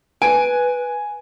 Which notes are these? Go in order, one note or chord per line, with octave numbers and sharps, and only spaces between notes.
B4 G#5 D7